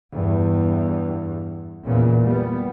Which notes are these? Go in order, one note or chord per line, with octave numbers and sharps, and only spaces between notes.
E2 G2
E2 A#2 C#3
G3 B3